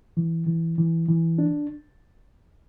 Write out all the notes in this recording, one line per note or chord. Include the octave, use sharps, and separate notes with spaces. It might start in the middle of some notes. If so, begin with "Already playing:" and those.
E3
E3
E3
E3
D4